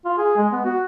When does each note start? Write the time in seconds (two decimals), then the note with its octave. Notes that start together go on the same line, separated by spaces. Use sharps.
0.05 F4
0.18 G#4
0.37 G#3
0.52 B3
0.65 F#4